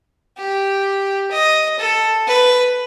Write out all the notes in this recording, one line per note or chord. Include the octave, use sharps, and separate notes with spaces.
G4
D#5
A4
B4